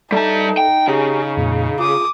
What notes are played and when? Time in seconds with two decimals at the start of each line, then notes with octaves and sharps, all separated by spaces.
0.12 G3 D#4 A4 E5 A5 A#5
0.57 G5
0.88 C#3 G4 G#4 A#5
1.37 F2 A#2
1.79 F4 G#4 D6 D#6